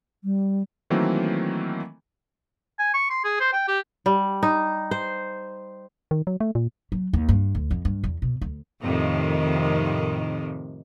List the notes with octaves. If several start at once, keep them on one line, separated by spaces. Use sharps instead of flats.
G3
D#3 E3 F#3 A3 A#3 C4
G#5
C#6
C6
G#4
C5
G5
G4
G3
D#4
C5
D#3
F#3
A3
A#2
F#3
D#2
G2
D2
F2
G2
E2
B2
D2
F2 A2 C3 D#3